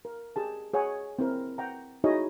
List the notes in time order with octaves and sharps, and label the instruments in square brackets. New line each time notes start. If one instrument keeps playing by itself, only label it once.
[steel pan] A#4
G4 G#4 A5
G#4 C#5 F#5 G#5
C4 E4 A#4
F#5 G5 A#5
D#4 E4 F#4 G#4 C#5 D#5